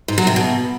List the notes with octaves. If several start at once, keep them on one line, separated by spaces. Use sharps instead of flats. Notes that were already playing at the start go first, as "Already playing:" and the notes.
G#2
F#3
C3
B2